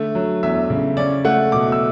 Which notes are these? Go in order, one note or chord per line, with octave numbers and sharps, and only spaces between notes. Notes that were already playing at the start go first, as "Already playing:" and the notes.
Already playing: D3 A3
F#3
E2 E5
C#3
C#4 D5
A3 F#5
B2 D6
E6